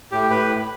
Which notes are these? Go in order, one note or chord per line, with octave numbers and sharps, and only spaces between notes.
A2 G4
A2 B4